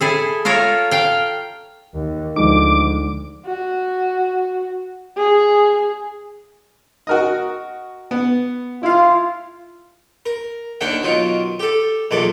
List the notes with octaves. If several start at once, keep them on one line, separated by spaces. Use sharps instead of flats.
E4 G#4 A4
F4 A4 A#4 C#5
F5 G5
D#2
D2 F3 G#3 D#4 D6
F#4
G#4
F#4 A#4 D#5
B3
E4 F4 F5
A#4
D#2 D#3 D4 F#5 G5
B2 D#3 F#3 F4
G4 A4
B1 E2 A#2 A4 D6